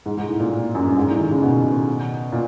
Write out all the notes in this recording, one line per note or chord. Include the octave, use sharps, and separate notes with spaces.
G#2
G#2
A2
A#2
F#2
G2
G#2
A2
D#3
C#3
B2
A#2